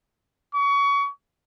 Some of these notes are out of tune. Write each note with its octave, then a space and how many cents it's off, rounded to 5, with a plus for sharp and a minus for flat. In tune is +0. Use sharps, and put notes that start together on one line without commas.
C#6 +30